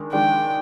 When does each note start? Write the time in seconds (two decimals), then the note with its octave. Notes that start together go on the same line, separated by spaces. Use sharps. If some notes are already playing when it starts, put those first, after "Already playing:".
Already playing: D#3 G#3 D4
0.13 D#3 G#3 D4 G5